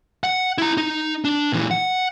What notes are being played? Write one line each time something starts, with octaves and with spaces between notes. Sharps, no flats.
F#5
E4 A#5
D#4
D4
A#2 E3
F#5